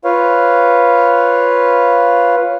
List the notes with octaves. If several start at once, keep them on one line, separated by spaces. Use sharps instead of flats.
F4 B4 C#5 F5